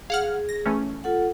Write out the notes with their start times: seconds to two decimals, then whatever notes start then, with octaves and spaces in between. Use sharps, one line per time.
0.10 G#4 F5 F#5 F6
0.49 A#6
0.66 E3 A3 C#4
1.04 F4 A4 F#5